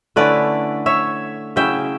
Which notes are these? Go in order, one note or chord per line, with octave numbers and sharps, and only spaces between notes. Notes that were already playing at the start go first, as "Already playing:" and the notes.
D3 A3 C#4 E4 B4 D5
C#5 E5
C#3 F#3 C#4 E4 E5 G5